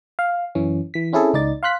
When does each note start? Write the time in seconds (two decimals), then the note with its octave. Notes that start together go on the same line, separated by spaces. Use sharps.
0.19 F5
0.55 F#2 E3 C#4
0.94 E3 B6
1.13 C4 C#4 E4 G#4 A4
1.33 C#2 D#4 D5 A6
1.63 F5 C6 F#6 B6